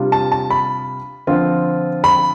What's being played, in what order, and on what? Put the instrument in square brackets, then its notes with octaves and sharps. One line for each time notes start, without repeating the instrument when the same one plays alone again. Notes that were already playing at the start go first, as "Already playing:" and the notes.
Already playing: [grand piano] C3 G3 D4 F4
A5
A5
B5
D3 F3 C4 F4
B5